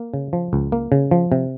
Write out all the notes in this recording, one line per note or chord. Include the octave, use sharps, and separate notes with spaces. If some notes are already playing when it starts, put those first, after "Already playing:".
Already playing: A#3
C#3
F3
C#2
A#3
C#3
F3
C3